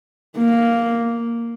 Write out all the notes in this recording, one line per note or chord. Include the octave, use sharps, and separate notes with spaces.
A#3